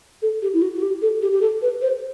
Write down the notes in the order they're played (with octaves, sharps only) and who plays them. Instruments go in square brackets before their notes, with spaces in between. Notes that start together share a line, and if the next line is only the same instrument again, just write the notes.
[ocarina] A4
G4
E4
F#4
F#4
G4
A4
G4
G4
A4
B4
C5